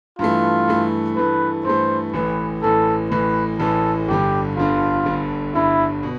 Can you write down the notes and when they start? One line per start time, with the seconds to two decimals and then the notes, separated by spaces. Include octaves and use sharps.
0.19 G2 E3 A3 F4
0.68 G2 E3 A3
1.17 G2 E3 A3 B4
1.65 G2 E3 A3 C5
2.13 A1 A2 E3 B4
2.63 A1 A2 E3 A4
3.11 A1 A2 E3 B4
3.60 A1 A2 E3 A4
4.08 G1 G2 D3 G4
4.57 G1 G2 D3 F4
5.06 G1 G2 D3
5.55 G1 G2 D3 E4
6.03 B2